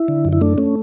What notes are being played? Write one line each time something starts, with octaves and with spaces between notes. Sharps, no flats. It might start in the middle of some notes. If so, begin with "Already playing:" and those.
Already playing: E4
D3
F#2
E4
A3 D4
A3 C#4